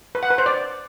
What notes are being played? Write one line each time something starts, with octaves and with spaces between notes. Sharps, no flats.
B4
F#5
B4
C5
D5